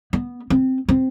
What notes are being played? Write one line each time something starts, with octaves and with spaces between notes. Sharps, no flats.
B3
C4
C4